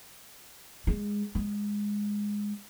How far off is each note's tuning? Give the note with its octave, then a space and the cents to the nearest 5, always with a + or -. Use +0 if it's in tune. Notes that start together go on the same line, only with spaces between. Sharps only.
G#3 -15
G#3 -10